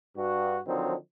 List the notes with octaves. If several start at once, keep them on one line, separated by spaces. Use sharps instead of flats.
G2 F#4
D3 D#3 F3 F#3 C4 D#4